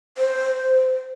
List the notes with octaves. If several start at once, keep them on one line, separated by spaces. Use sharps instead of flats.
C5